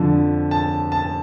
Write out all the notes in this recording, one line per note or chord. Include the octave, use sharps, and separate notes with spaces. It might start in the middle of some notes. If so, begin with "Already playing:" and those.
Already playing: F2 D3 F3 A5
A5
A5